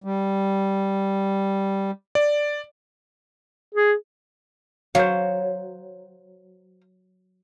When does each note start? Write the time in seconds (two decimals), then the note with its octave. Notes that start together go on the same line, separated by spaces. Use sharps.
0.04 G3
2.15 D5
3.75 G#4
4.95 F#3 C5 F5